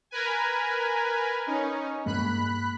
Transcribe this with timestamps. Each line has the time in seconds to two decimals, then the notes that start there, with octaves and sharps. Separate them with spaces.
0.11 A#4 B4 G#5
1.46 C#4 D#4
2.06 G2 G#3 A#3 B5 F#6